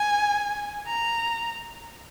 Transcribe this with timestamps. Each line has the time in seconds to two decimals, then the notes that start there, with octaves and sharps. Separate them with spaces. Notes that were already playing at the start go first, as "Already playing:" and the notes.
Already playing: G#5
0.87 A#5